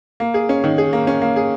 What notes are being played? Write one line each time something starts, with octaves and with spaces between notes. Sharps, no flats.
A#3
G#4
C#4
D#3
G#4
A#3
C#4
A#3
G#4